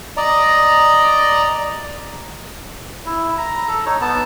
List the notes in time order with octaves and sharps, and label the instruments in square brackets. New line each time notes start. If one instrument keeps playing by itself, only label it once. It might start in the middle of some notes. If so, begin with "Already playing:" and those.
[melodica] D5 D#5 A#5
E4
A#5
A4
D#4 C#5
B3 A5